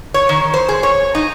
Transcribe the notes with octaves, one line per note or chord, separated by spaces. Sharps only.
C#5
D#3
C5
G#4
C#5
D#4